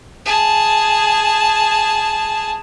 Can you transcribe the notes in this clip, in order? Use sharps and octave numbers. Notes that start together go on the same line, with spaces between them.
G#4 A5